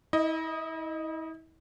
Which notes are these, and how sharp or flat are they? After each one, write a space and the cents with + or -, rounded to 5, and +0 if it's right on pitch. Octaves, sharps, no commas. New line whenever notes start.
E4 -40 D#5 +0